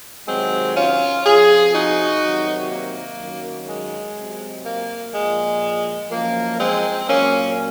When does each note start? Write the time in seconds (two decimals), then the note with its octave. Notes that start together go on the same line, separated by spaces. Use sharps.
0.28 C3 D#3 F#3 G#3 C4
0.76 C#4 F4
1.25 C3 F3 F4 G#4
1.74 D#4 F#4
2.23 C3 D#3 F#3
2.71 A#3
3.19 F#2 D#3 F#3
3.69 G#3
4.17 C3 F#3
4.65 A#3
5.14 A#2 F3 G#3
6.11 F#2 F3 A#3
6.59 G#3 C4
7.08 A#2 F#3 A#3 C#4